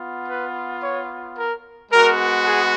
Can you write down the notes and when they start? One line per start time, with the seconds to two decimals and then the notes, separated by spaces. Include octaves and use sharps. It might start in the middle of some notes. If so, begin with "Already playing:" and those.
Already playing: B3 F4
0.28 B4
0.82 C#5
1.36 A#4
1.91 G#3 B3 F#4 A#4
2.45 G#4